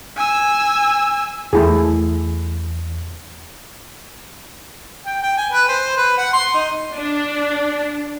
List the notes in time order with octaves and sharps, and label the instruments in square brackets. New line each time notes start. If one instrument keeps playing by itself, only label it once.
[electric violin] G#5 E6
[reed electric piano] E2 [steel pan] A3 E4 G#4
[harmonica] G5
G5
G#5
B4
C5
B4
F#5
C6
D#4
[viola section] D4